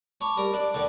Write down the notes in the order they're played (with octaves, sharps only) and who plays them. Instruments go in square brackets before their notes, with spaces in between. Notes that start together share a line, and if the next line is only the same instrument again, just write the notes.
[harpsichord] C#5 [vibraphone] A5 B5 D6
[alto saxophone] G3 [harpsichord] A#4
[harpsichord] D4 [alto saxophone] D5
[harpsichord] D#2 D3